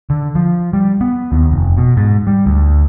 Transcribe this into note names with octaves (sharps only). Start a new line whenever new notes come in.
D3
F3
G3
B3
D#2
F1
B2
G#2
G3
D2